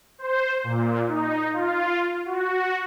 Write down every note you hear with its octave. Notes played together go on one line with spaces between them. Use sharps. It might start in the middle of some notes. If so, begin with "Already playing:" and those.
C5
A#2
D#4
F4
F#4